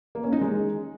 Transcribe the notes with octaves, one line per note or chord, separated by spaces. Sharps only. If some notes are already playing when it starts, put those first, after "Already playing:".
A#3
C#4
D#4
G#3